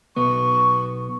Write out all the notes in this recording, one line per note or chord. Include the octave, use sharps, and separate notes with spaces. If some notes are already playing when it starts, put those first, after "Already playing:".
B1 B3 C#6